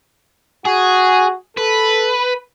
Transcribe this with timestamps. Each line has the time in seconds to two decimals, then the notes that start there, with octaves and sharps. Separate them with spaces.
0.66 F#4 G#4
1.57 A4 B4